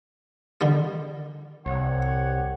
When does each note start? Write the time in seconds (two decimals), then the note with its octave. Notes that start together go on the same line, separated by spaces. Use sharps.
0.61 D3 D#3 G3
1.66 C2 G4 C#5 F#5